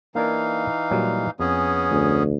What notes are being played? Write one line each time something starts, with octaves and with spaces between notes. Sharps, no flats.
E3 A#3 D4 D#4 A#4 F5
A#2 F#3 G3
F2 B3 C#4 G#4
D2